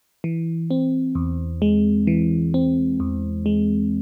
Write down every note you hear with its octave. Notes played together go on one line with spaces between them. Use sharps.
E3
C4
E2
G#3
E3
C4
E2
G#3